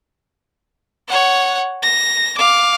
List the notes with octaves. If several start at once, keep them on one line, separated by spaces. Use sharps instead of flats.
C#5 F#5
A#6
F5 D6